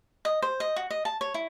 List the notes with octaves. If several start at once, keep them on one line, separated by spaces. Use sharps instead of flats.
D#5
C5
D#5
F#4
D#5
A5
C#5
E4